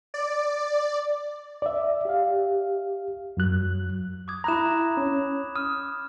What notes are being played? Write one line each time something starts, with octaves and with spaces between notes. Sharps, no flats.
D5
D5 E5
G4 F5
F#2 F#3 F#6
D6 D#6 G#6
E4 A#5 B5 F#6 E7
C#4
D#6 F6